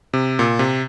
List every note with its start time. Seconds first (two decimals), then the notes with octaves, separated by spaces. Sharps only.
0.13 C3
0.39 A#2
0.59 C3